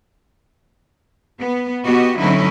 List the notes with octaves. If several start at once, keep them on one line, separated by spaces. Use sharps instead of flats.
B3
B3 F#4 G4 D#5
D3 F#3 C#4 D#4 E4